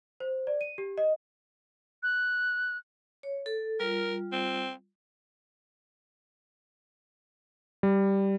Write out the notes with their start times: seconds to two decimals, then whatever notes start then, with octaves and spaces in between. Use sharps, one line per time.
0.20 C5
0.47 D5
0.61 D#7
0.78 G4
0.98 D#5
2.03 F#6
3.23 C#5
3.46 A4
3.80 G3 F4 A#4
4.32 C4
7.83 G3